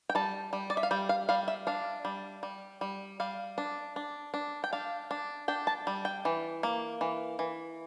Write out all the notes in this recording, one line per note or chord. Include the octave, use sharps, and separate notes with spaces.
G5
G3 A5
G3
D5
E5
F5
G3 G5
F5
G3 F5
E5
D4 F5
G3
G3
G3
G3 F5
D4
D4
D4
G5
D4 F5
D4
D4 G5
A5
G3
G5
E3
A#3
E3
E3